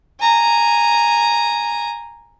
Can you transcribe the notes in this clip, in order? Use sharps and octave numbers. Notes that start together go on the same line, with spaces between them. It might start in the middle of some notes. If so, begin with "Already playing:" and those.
G#5 A#5